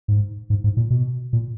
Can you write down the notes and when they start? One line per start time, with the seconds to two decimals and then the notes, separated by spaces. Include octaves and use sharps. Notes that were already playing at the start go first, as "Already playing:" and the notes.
0.08 G#2
0.50 G#2
0.64 G#2
0.77 A#2
0.90 B2
1.33 A#2